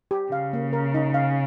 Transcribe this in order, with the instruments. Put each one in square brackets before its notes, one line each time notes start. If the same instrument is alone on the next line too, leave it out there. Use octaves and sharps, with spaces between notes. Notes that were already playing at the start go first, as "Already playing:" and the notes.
[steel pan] G4
[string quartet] C#3 [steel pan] F5
[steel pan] A#3
A#4
D#4
F5